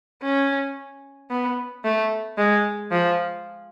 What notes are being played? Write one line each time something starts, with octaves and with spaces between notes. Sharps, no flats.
C#4
B3
A3
G#3
F3